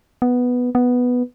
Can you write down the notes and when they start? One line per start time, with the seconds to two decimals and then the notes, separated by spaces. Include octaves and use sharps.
0.22 B3
0.75 B3